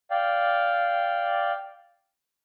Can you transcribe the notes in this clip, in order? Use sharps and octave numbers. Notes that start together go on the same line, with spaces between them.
D5 F5 G5